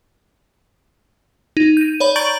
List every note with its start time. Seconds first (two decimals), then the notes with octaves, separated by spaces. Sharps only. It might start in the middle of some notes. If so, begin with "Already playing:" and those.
1.57 D#4
1.77 G6 D#7
2.00 C#5 D5 B5
2.16 A#5 C#6 G6 A6 D7 F#7